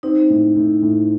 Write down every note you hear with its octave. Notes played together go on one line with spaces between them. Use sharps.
C4 D#4
A2
A2
A2